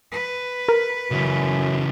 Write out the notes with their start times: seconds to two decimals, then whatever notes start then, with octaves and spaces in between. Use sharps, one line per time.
0.11 B4
0.68 A#4
1.11 F#2 C#3 E3